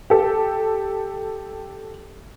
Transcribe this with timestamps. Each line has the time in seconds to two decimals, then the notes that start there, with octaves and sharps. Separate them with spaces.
0.10 G4 A4